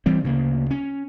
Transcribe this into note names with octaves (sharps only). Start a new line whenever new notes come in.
E3 G3 C4
D2 C#3 A#3
C#4